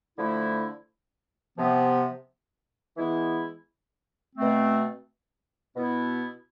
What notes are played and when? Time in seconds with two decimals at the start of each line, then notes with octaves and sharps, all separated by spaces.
0.18 D3 F3 A3 E4
1.57 C3 F3 B3
2.96 E3 G#3 B3 E4
4.36 B2 A3 C4
5.75 B2 B3 E4